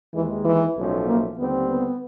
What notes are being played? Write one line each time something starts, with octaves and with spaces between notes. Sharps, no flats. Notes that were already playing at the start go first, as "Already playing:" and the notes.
D#2 D#3 E3 G#3
E3
B1 A2 F3 A3 C#4
A#3
D#2 D3 G3 B3 C4
B3